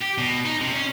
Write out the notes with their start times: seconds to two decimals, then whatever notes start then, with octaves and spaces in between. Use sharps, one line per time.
0.02 G4
0.18 B2
0.45 D#4
0.61 C3
0.73 C#4